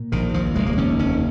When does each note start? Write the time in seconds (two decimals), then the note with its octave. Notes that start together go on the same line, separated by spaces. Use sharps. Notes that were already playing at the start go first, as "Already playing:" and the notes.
Already playing: A#2
0.12 A#1 D#3
0.34 D#2 F3
0.55 F1 G#3
0.66 A#3
0.78 D#2 C#4
0.99 F1 C#4